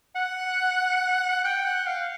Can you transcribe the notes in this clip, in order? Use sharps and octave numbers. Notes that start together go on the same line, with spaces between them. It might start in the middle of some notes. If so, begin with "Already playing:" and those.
F#5
G5
F#5
F5